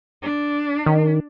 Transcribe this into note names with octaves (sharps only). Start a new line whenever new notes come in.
D4
D#3